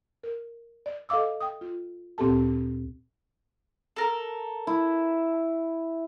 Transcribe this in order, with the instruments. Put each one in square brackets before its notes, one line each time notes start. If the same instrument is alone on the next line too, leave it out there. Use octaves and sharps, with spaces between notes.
[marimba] A#4
D5
A4 D#5 F5 D6 E6
G5 D#6
F4
D2 A#2 C4 G4 A4 A5
[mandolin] A4 A#4
[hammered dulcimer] E4